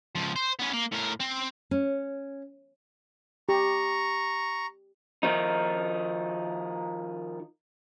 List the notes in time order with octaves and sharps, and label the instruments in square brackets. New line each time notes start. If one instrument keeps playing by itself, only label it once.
[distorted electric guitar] C#2 F3
C5
B3 C#4
A#3
A2 A#4
C4
[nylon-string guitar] C#4
[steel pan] G4 [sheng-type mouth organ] A#5 C#6
[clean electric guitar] D#3 F3 D#4